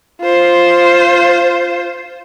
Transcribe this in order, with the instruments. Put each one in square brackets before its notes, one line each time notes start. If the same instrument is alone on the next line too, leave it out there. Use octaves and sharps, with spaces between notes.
[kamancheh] F4 C5